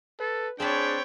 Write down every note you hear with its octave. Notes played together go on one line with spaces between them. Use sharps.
A4 B4
C4 D4 G#4 C#5 G5 A5 B5